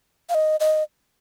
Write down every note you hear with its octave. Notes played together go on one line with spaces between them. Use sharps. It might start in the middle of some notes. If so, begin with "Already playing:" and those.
F5
D#5
D#5